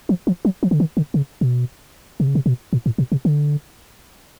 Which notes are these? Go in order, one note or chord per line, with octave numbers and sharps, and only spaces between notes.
F3
F3
F#3
F3
D3
D#3
D3
C#3
B2
C3
C#3
C3
B2
A#2
A2
B2
C3
D3